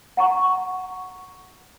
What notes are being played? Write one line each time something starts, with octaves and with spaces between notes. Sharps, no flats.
F#5 A#5 C#6